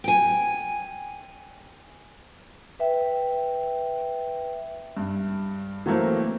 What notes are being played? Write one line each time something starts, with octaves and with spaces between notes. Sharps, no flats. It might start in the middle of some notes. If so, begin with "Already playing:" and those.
G5 G#5
B4 E5 G5
G2
E3 F#3 A3 A#3 C4